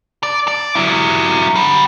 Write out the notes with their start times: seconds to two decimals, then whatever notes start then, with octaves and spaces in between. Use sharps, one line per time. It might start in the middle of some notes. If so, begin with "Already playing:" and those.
0.23 D5
0.48 D5
0.75 F#3 E4
1.55 D3 G3